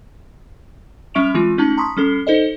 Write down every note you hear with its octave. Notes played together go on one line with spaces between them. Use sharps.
G3 C#4 E5 C#6 D7 F7
E3 G#3 C4 F4
A3 C#4 D#4 A5 F#7
A5 A#5 C6 C#6 D#6 B6
G3 C#4 A4 C7
D#4 A4 C5 D5 D#5